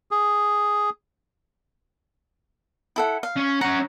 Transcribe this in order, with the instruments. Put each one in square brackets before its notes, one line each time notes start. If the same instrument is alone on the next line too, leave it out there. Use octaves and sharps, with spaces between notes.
[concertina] G#4
[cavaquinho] E4 A4 F#5
F5
[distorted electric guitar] C#4
[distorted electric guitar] C#4 F#5 [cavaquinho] A#5